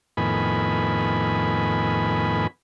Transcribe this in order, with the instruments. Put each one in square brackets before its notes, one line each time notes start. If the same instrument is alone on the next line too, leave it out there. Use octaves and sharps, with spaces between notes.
[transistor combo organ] F2 A2 D#3 B3 G#5 B5